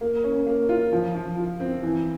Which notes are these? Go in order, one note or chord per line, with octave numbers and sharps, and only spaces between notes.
A#3
C#4
A#3
F4
F3
F3
F4
C4
E3